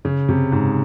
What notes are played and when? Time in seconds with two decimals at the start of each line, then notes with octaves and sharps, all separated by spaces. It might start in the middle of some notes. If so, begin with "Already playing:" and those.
0.05 C#3
0.29 C3
0.52 G#2